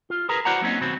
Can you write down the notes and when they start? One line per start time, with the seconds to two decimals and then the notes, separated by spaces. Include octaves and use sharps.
0.10 F4
0.29 G#4 A#4 B4 A#5
0.45 E4 F#4 C5 D5 F#5 A#5
0.61 F#3 A#3 C4 C#4 D#4
0.80 D#2 B2 F#3 C4